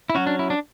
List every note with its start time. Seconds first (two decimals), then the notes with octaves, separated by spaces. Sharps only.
0.10 E4
0.15 F#3 C#4 F#4
0.27 D4
0.39 E4
0.50 D4